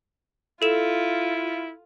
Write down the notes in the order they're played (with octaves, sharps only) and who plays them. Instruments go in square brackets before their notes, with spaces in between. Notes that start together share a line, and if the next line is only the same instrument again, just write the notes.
[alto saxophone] E4 [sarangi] F4 [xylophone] A4 E7